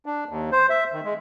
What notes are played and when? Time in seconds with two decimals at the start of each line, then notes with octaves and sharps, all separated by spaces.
0.06 D4
0.29 D#2
0.52 C5
0.70 E5
0.93 D#3
1.04 G#3